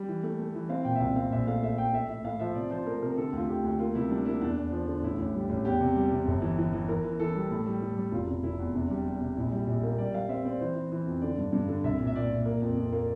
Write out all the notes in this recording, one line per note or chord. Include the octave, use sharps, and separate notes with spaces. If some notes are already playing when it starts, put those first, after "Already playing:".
Already playing: G3
E3
A3
A3
E3
C4 F5
A#2 G5
E5
C2 F5
C4 F5
A#1 E5
A3 F5
A3 E5
A3 G5
A3 E5
A2 E5
A2 F5
F3 E5
C3 D5
F3 C5
A3 A#4
C3 A#4
D3 A4
D2 F4
D2 G4
D2
A#3 F4
C3 E4
G3 D4
A#3 E4
E2 D4
E2
F3
D3
A1 E4
A1
G3
A1
E2 G4
C3
G3
C3
G1
E3
E3
E3
E3 A#4
E3
E3 A4
G3
A2
G3
A2
G3
F1 F4
F1
F1 E4
E2
C3 D4
G3
G3
C3
A#1 E4
G3
A#1
A#3
G3 D5
G3 F5
C4 E5
C4 D5
E3 C5
E3
E3
F2
D3 D5
G2
G2
D3
C2 E5
A#2
E5
A#2 D5
A#2
A#3
F2
F2
A#3